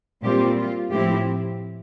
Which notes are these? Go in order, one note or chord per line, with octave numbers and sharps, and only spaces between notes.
A#2 G3 C4 F4 G4
F4
A2 F3 C4 E4 G4